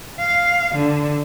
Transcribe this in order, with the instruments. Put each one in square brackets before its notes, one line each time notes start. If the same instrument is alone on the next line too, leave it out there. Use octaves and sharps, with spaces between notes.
[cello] F5
D3